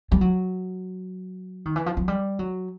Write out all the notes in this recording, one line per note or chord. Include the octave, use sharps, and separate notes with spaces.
G3
F#3
D#3
E3
F3
F#3
G3
F#3